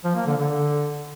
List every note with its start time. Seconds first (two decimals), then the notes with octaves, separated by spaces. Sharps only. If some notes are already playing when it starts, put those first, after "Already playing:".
0.04 F3
0.15 A#3
0.26 D3
0.37 D3